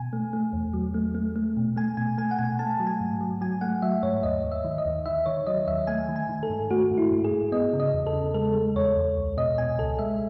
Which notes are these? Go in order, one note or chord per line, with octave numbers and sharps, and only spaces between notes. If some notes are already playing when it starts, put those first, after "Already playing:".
Already playing: B2 G#5
A3
A3
E2
F#3
A3
A3
A3
B2
A3 G#5
B2 G#5
A3 G#5
F#5
B2 G#5
A3 A5
F#3
G#5
G#2
F#3
F#3 G#5
A3 F#5
F#3 E5
G#2 C#5
D#2 D#5
D#2
E5
D#3
D#5
D#2
D#3 E5
D#3 C#5
F#3 D#5
D#2 E5
A3 G#5
D#3
G#5
D#3
A4
G#2
A3 F#4
G#2
E4
G#2
G#4
G#2
B3 D#5
C#3
D#5
E2
A4
C#3
G#3 A4
G#3
E2 C#5
E2
C#2
B2 D#5
B2 G#5
C#2 A4
G#3 E5